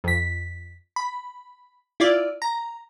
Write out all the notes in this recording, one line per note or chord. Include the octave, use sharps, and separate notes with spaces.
F2 B6
B5
E4 F4 D5
A#5